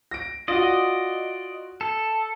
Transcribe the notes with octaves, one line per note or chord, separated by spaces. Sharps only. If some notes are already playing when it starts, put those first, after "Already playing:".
A#6 D7
F4 F#4 D5 D#5
A4